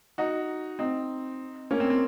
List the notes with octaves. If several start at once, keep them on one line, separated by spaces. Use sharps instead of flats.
D#4 F#4
C4 D#4
A#3 C#4
C4
C4